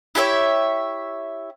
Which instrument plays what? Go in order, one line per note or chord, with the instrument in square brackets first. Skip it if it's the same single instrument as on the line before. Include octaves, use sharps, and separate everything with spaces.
[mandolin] E4 G4 C#5 E5